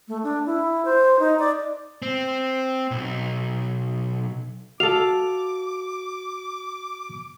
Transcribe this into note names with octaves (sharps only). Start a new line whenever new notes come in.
A3
D4
E4
C5
D#4
D5
C4
B1
F#4 A4 F5 D6 F7